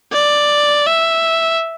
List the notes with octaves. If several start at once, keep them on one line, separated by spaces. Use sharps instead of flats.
D5
E5